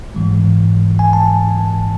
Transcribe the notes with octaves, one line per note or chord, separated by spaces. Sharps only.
G#2 E3 G#3
G#5
A5